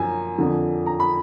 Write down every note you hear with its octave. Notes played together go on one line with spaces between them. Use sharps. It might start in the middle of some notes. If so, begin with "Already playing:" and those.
Already playing: F#2 F3 G#5 A#5
F2 D3 F3
A#5
B5